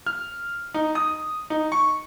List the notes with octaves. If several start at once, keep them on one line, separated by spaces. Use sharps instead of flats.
F6
D#4
D#6
D#4
C#6